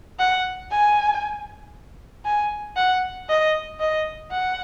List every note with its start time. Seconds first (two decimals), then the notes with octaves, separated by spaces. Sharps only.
0.19 F#5
0.71 G#5
2.25 G#5
2.76 F#5
3.29 D#5
3.80 D#5
4.31 F#5